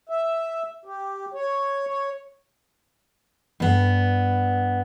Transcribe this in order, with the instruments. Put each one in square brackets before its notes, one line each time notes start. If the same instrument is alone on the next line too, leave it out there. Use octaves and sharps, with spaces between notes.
[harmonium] E5
G4
C#5
C#5
[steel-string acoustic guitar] G2 B3